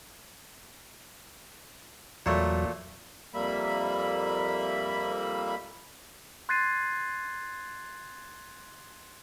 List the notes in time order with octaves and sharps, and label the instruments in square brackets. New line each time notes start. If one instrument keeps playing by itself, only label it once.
[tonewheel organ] E2 F#3 [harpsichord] A#2 A3
[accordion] F2 G3 A#3 E5 B5
[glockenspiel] C6 F#6 G#6 A6 C7 D#7